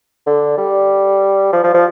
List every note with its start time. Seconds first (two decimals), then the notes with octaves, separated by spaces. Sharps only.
0.27 D3
0.58 G3
1.53 F3
1.64 F3
1.74 F3